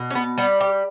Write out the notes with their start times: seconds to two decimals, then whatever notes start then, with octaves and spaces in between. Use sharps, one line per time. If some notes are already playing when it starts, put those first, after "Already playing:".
Already playing: B2
0.11 C#4
0.15 B3
0.38 G3 B3
0.61 G4